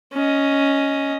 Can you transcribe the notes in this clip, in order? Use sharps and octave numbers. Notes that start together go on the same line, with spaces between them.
C#4 D#5